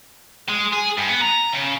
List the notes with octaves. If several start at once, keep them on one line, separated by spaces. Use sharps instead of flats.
G#3
G#4
G2
B3
A#5
C#3